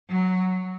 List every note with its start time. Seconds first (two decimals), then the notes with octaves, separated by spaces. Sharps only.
0.09 F#3